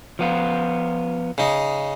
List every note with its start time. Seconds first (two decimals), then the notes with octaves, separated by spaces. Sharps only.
0.19 F3 B3 F4
1.38 C#3 D#4